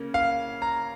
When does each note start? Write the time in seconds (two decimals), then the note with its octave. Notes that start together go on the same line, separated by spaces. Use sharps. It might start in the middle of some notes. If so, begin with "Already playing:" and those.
Already playing: C#3 A#3 C#4
0.14 F5
0.62 A#5